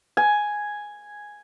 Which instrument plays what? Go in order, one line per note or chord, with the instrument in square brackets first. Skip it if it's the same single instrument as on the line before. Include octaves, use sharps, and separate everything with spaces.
[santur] G#5